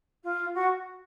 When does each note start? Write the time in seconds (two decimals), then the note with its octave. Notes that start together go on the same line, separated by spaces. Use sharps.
0.23 F4
0.54 F#4